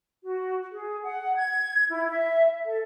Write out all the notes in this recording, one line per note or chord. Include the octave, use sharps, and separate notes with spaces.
F#4
G#4
F#5
G#6
E4
E5
A4